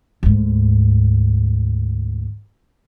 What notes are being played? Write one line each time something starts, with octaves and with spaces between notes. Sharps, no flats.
D2 G#2